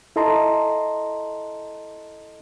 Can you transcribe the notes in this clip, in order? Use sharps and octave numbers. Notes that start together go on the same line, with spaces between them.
E4 A4 D#5 A5 A#5 C6